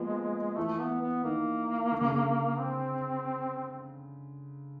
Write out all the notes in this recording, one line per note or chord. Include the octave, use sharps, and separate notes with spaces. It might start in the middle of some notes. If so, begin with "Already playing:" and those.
Already playing: F3 G#3 A#3 B3
E3 A3
B3
B3
D#3 A#3
D3
C#3
D3
C4